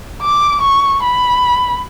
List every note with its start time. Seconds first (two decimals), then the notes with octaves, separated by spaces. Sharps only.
0.22 D6
0.62 C#6
1.02 B5